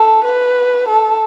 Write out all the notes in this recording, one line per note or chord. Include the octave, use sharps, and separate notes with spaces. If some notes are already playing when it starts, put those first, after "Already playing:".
Already playing: A4
B4
A4